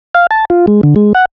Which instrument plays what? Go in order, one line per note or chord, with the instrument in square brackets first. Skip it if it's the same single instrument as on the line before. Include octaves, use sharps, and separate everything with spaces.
[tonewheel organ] F5
A5
F4
G#3
D3
G#3
F#5